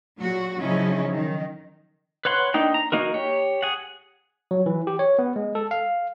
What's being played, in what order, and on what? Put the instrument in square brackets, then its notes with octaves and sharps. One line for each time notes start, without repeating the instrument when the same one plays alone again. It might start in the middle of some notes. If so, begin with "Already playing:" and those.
[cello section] A#2 F#3 F#4
C#3 F3 F#3 C#4 D#4 E4
D#3
[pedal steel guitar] B4 C#5 F#5 C6
A#3 D4 D#4 G5
A#5
A#3 D#4 F#4 A#4
G4 C#5
G#4 F#5
[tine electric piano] F#3
E3
G4
C#5
B3
G#3
A4
F5